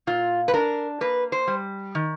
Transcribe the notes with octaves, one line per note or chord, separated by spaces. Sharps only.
A#2 F4
B4
D4 A#4
A#3 B4
C5
G3
D#3